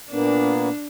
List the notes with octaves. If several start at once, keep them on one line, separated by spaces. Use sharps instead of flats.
A#2 A#3 B3 D4